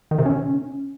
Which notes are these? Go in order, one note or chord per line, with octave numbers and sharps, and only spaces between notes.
D#3
C3
C#4